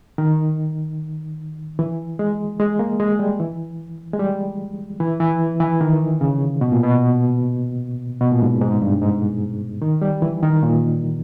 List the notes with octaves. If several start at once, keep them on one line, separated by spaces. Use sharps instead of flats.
D#3
E3
G#3
G#3
A#3
G#3
G3
E3
G#3
G3
E3
E3
E3
D#3
C#3
B2
A#2
B2
B2
A#2
G#2
G#2
G2
G#2
D#3
G3
E3
D#3
A#2